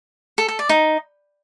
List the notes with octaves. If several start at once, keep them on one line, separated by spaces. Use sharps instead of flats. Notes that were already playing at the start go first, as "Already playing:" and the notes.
A4
A4
D5
D#4